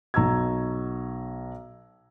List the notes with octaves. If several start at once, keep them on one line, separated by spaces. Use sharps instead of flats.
B1 A#5 C#6 E6 G#6